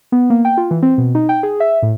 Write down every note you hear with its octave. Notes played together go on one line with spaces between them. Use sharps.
B3
A#3
G5
F4
E3
C4
B2
D#4
G5
G#4
E5
A2